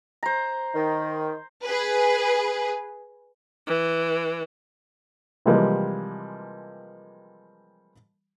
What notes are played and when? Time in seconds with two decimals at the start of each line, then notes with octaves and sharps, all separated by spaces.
0.23 C5 A#5
0.75 D#3
1.65 G#4 B4
3.67 E3
5.46 C3 E3 F3 G3 G#3 A#3